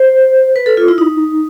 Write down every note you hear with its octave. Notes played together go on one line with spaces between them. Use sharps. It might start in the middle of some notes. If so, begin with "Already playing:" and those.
Already playing: C5
B4
A4
F4
E4
D#4